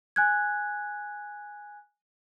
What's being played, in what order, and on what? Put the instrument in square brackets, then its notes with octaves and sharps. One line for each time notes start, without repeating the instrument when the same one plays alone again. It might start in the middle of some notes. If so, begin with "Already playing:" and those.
[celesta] G#5 F#6 G#6